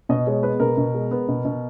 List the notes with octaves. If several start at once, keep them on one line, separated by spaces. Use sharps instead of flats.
B2 D#5
G#3 C#5
B3 B4
B2 A#4
B2
G#3
B3
B2
B2